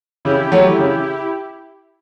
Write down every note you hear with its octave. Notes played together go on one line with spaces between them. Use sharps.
C#3 E4 G4
F#3 A3
C#3